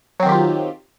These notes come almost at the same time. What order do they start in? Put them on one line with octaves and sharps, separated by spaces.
F#3 C4 D#3 G4 F4